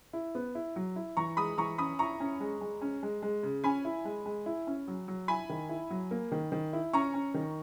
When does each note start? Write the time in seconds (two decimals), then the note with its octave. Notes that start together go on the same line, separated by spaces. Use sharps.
0.13 E4
0.35 B3
0.55 E4
0.76 F#3
0.96 E4
1.17 E3 A#5 C#6
1.37 G#3 B5 D#6
1.58 E3 A#5 C#6
1.78 C#4 B5 D#6
1.99 E4 A#5 C#6
2.20 C#4
2.40 G#3
2.61 G#3
2.81 C#4
3.03 G#3
3.22 G#3
3.43 C#3
3.64 C#4 G#5 B5
3.85 E4
4.05 G#3
4.26 G#3
4.46 E4
4.67 C#4
4.88 F#3
5.08 F#3
5.28 E4 G#5 B5
5.49 D#3
5.69 E4
5.90 F#3
6.11 A#3
6.32 D#3
6.52 D#3
6.73 E4
6.93 C#4 A#5 C#6
7.14 C#4
7.34 D#3